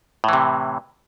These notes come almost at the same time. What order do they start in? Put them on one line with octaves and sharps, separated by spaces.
A2 E3 C3